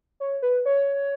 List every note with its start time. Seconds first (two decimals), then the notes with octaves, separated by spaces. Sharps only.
0.20 C#5
0.42 B4
0.65 C#5